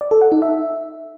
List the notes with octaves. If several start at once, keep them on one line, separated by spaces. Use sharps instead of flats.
D5
A4
F#5
D#4
E5